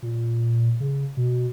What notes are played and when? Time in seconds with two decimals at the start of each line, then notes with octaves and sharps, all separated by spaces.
0.02 A#2
0.80 C#3
1.17 B2